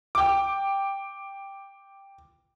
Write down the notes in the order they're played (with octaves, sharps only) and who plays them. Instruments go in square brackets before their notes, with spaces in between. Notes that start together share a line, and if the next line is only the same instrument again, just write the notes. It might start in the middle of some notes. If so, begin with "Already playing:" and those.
[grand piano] G5 D6